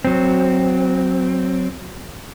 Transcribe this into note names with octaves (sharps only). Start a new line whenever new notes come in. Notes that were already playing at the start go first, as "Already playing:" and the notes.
F#3 C4